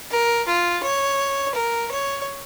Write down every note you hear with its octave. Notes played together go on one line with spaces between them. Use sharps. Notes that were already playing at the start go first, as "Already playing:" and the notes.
A#4
F4
C#5
A#4
C#5